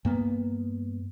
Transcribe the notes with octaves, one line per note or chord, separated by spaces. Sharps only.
G2 A#3 B3